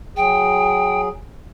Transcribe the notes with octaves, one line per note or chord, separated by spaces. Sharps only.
F#3 G#4 G5